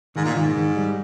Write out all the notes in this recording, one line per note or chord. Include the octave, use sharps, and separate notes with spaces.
G#2 D#3
A#2
G#2 D#3
D#3
G3